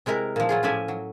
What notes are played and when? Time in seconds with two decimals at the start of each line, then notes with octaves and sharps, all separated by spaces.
0.06 C3 G#3 E4 A#4
0.36 A#2 F3
0.49 F#3 F4 G#4
0.63 A2 F3 C#4 D5 E5 G#5
0.88 F#3